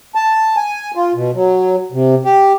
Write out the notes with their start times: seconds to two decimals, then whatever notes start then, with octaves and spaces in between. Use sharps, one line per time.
0.15 A5
0.56 G#5
0.95 F4
1.15 B2
1.34 F#3
1.92 C3
2.25 G4